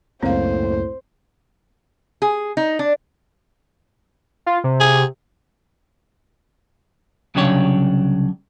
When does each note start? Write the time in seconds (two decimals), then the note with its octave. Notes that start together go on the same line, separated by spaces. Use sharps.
0.23 C#2 F#2 A2 A#3 C4 C5 F5
2.22 G#4
2.57 D#4
2.79 D4
4.46 F4
4.64 C3
4.80 G#4
7.35 C2 C#3 F#3 D4 G4 C#5